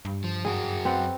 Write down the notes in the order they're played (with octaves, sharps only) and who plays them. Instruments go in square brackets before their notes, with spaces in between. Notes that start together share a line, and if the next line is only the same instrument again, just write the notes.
[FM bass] G2
[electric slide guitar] F3
[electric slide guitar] F#2 F#4 G5 [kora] G#4 C#5
[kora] C4 B4 F#5